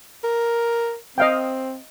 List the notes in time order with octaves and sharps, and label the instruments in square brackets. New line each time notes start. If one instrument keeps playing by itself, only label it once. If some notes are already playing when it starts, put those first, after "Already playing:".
[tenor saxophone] A#4
[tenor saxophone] C4 [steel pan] D#5 F5 G5